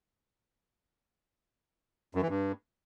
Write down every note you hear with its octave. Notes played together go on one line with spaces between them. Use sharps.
F#2
E3
G2